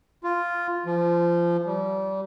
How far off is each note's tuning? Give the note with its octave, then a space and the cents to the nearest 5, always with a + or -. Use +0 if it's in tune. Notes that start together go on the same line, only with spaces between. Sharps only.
F4 -5
F3 -25
G3 -30